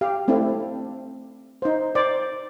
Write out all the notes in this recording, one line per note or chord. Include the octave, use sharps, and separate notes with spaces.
G4 F5
A3 C4 D4 E4
D#4 C5
C5 D5